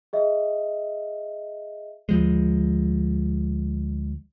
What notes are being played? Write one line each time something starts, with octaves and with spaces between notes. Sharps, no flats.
G#4 D#5 E5
D2 F3 G#3